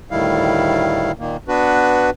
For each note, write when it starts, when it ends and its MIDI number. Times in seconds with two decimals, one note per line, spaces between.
0.11 1.12 38
0.11 1.12 45
0.11 1.12 51
0.11 1.12 55
0.11 1.12 64
0.11 1.12 77
1.19 1.37 46
1.19 1.37 51
1.19 1.37 58
1.48 2.10 59
1.48 2.10 62
1.48 2.10 66
1.48 2.10 71